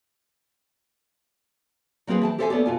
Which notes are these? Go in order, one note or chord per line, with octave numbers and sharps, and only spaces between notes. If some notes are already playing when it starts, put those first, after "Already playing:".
F#3 A#3 C4 F#4 G#4 B4
E3 G#5 A5
G4 A4 C5 C#5 E5 G#5
A#3 B3 A4 C#5 D5
B2 F4 G#5